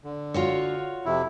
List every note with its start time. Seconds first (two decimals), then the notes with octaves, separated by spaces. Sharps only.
0.04 D3
0.34 F4 F#4 C#5
1.05 F2 C3 E4